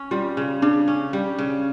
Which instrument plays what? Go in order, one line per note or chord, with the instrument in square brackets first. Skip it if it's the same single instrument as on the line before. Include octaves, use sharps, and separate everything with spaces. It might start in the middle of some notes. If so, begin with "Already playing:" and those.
Already playing: [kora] C#4
[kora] G3 [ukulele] F4
[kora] C#3
[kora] C#3 [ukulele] D4
[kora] C#4
G3
C#3